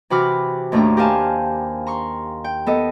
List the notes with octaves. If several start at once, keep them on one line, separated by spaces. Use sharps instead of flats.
C3 E3 F#4 B5 D6 F6
D#2 A2 A3 D4 D#4 A#5
G4 A#4 C5 F5 G#5 A5
A#5 C6 C#6
G5
B3 A4 D#5